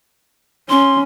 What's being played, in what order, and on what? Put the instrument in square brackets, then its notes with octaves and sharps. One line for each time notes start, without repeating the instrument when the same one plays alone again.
[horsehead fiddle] C#4 [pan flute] C6